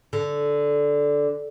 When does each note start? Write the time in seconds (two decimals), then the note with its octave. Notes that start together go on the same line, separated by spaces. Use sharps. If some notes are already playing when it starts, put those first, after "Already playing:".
0.13 D3